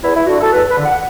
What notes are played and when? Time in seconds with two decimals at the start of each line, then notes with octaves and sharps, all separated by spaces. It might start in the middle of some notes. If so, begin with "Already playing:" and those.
0.03 E2 E4
0.15 E4
0.27 D3 F#4
0.40 A4
0.52 E2 B4
0.70 B4
0.77 D3
0.86 F#5